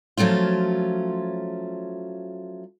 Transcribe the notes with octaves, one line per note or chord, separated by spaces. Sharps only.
F3 F#3 A3 C#4 F4